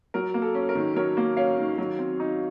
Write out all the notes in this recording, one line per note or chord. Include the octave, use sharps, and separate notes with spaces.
F#3 A#4
A#3
A4
C#4
A#4
D#3
F#3 A#4 C#5
A#3
C#4 C#5 F5
D#3
F#3
C4
D#4